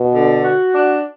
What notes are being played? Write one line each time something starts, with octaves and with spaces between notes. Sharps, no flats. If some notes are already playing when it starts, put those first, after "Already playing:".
Already playing: B2
D3
F#4
D4